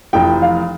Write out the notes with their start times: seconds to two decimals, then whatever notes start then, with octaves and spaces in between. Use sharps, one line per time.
0.13 F1 F2 E3 G5
0.42 F5